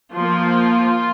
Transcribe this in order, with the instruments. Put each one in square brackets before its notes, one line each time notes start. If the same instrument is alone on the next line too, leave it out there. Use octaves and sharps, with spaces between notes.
[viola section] F3 A#3 F4